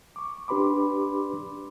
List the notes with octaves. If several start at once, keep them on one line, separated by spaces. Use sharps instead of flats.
C#6 D6
D4 G4 B4 B5 C6 D6